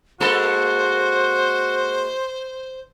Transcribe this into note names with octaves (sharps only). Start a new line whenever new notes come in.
G#3 A#3 F#4 A4 C5